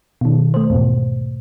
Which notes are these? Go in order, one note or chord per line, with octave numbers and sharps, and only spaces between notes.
B2 D#3
A3 C5
E2 G#2 B2